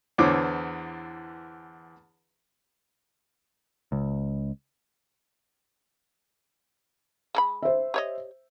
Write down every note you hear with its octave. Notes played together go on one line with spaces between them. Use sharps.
E2 D3 E3 C5 C#5 D6
C#2
G#3 A4 B5
C5 E5
G4 C#5 D#5